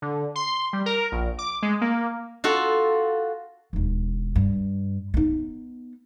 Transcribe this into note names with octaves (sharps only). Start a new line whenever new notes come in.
D3
C6
G3
A#4
A#1
D6
G#3
A#3
F4 F#4 A4
E1 D#2
G2
B3 D#4